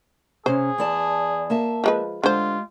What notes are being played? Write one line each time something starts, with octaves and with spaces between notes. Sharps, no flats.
C3 C#4 G#4 C5
E2 D5 A5
A#3 E5 A5
F3 G#3 B4
D3 G#3 F4 G4 C5